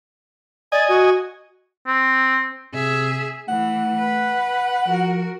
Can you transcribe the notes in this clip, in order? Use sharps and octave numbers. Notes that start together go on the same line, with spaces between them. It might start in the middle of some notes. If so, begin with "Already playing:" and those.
D5 D#5 G#5
F#4
C4
C3 G#4 E5
E3 A3 F#5
B4
F3 F#4 A#4